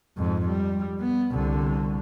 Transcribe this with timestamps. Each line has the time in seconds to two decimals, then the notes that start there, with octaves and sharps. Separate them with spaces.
0.17 F2 G#2
0.48 G3
1.00 B3
1.31 C2 D3